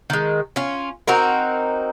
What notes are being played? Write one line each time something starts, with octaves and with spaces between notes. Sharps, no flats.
D#3 G#3
C#4 F4
C4 D#4 F#4 A#4